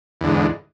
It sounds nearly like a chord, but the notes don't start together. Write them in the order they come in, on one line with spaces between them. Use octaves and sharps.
E2 D3 G#2